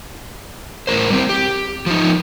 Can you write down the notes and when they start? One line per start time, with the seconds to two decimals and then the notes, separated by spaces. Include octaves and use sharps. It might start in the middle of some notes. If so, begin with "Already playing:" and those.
0.87 A2 A#4 C5
1.10 G3 A#3 C4
1.29 G4
1.86 F3 D#4